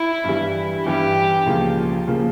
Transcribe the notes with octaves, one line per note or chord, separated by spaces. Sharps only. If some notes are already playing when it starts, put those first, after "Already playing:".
Already playing: E4
G2 E3 G3
G2 E3 G3 G4
C#2 C#3 F3 A#3
C#3 F3 A#3